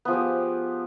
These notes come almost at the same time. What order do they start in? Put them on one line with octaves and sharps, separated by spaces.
B3 F3 G#4 G4